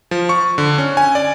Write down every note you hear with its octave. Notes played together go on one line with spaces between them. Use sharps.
F3
C#6
D3
C#4
G#5
D5